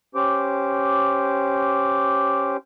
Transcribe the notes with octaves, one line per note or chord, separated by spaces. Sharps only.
C#4 G4 C5 D6